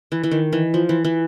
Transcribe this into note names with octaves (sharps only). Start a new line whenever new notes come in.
E3
E3
D#3
E3
F3
E3
E3